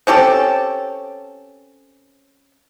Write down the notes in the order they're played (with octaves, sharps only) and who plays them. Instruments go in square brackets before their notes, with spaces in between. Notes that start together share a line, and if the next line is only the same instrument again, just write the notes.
[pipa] C4 C#4 G4 A4